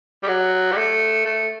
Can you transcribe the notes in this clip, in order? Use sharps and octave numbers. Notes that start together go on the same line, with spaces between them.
G3
F#3
G3
A3
A3